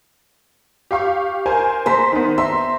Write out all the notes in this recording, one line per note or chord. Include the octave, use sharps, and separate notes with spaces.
G4 F5 C#6
A#4 C5 G#5
C5 A#5 C6 B6
D#3 B3
E5 A#5 C6